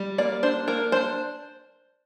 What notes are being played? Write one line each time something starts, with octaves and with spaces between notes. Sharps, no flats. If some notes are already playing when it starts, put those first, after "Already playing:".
Already playing: G3
A#3 D5
D4 C5
A#3 A#4
D4 C5